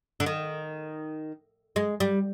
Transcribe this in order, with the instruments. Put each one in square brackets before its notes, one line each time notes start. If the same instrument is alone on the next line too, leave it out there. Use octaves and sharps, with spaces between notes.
[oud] D3
D#3
G#3
G3